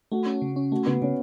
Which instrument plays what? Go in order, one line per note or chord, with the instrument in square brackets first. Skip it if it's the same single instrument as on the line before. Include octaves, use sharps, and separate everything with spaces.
[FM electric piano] A3 [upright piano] F#4
[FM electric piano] C#4
C#3
C#4
[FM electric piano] A3 [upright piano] F#4
[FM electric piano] C#3 [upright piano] B3
[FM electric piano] C#3 [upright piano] C#4